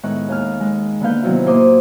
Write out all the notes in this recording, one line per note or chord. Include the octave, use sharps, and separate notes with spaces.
A2 D#3 G#3 B3 C#6 F#6
D#2 G#4 F6
G#3
D3 A#3 B3 B4 F5 G6
C3 D#3 F#3 B3 E4 F4
A2 A#3 C5 C6 D6 D#6